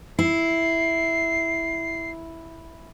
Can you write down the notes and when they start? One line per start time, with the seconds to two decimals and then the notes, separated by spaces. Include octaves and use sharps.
0.19 E4 C7